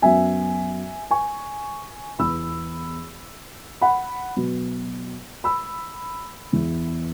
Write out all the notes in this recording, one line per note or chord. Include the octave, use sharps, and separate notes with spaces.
F#2 F#3 B3 E5 G#5
G#5 C#6
E2 E3 B3 B5 E6
F#5 B5
B2 F#3 B3
B5 E6
E2 E3 B3